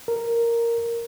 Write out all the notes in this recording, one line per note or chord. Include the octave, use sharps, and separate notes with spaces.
A#4